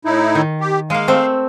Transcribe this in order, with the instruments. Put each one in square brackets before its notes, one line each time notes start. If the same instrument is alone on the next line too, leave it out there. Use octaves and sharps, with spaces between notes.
[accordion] A2 D#4 E4
[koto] D#3
[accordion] G4
[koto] G#3 A#3 [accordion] F5
[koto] A3 C4